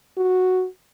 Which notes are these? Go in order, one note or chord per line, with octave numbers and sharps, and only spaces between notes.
F#4